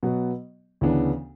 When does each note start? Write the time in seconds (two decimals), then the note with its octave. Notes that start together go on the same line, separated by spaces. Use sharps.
0.03 B2 F#3 B3
0.81 D2 C#3 E3 B3 D4